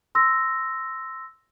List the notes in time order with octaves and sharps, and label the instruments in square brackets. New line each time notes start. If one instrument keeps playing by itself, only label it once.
[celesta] C6 E6 A#6